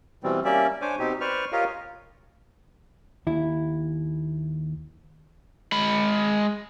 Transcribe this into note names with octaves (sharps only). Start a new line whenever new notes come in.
B2 E3 G3 C4
G3 A#3 C#4 D5 E5
D4 C5 C#5 G#5 D6
B2 C4 D#4 G4
B4 C5 D5 C#6 F6
F4 G4 A#4 C#5 D#5 F5
D#2 E4
G#3 B5